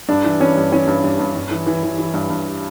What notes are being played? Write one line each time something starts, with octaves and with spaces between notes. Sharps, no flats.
G2 D4
E3
E3 C#4
G2
E3 C#4
G2
G2
G2
G2
E3
E3
E3
E3
G2
G2